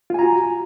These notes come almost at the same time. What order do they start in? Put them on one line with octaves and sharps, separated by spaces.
F4 G#5 A#5 F#4